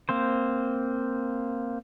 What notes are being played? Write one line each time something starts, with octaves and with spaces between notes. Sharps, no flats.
A#3 C4 C5